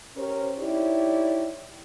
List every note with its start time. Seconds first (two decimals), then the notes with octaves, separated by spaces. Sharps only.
0.16 C#4 G4 A#4 C5
0.58 D#4 E4 G4 C#5 D5